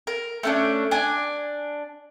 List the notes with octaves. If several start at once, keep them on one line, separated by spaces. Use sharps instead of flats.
A#4
A3 C#4 D4
D4 G#5